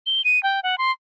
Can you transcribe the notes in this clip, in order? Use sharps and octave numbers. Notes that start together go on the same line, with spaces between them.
G7
D#7
G5
F#5
C6